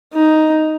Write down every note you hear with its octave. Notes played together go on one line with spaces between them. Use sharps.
D#4